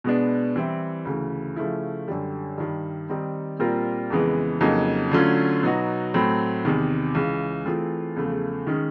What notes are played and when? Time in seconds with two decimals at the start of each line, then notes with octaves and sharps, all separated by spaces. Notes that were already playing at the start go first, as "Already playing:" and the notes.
0.04 B2 G#3 B3 D4
0.56 E3 G3 C4 E4
1.05 D2 C#3 E3
1.56 C#3 F3 A3 C#4 E4
2.08 F#2 D3 G3
2.58 G2 D#3 G3
3.10 D#3 G3 C4 D#4
3.59 A#2 G3 C4 F4 A#4
4.10 F2 C#3 E3 G#3 B3
4.61 F2 C#3 F#3 A#3 D#4
5.11 D3 F#3 A3 C#4 F4
5.63 B2 F#3 B3 D#4 F#4
6.14 A2 F#3 A3 C4
6.65 E2 C3 D#3
7.15 C#2 C#3 E3
7.65 E3 A3 C4 F4 G#4
8.16 E2 C#3 F3 A3
8.67 D#3 G#3 C#4